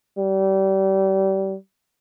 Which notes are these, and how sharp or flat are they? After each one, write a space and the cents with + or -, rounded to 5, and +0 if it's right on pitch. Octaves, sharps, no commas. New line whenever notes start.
G3 -30